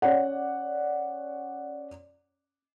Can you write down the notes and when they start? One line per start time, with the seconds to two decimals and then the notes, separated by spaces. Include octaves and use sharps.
0.02 C#4 C#5 D5 F#5